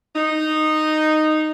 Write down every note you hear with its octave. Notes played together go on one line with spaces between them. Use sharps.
D#4